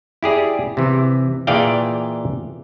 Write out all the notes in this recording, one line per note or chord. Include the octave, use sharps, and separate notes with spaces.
E4 G4 G#4 D5
C3 E3
A#2 E3 G#4 D5 F5 G5